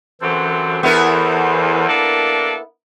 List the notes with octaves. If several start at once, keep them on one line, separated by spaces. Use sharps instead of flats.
F#2 C3 E3 F#3 A4 C5
E2 B3 E4 A#4
A#3 D4 A4